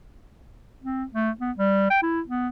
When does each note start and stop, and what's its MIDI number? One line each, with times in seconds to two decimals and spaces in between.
0.83 1.04 60
1.14 1.31 57
1.41 1.52 59
1.58 1.90 55
1.90 2.01 79
2.03 2.21 64
2.28 2.48 59